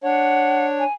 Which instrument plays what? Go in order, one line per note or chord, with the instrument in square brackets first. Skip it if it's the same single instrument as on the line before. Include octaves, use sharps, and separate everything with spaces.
[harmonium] D4 C#5 [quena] F#5
[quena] G#5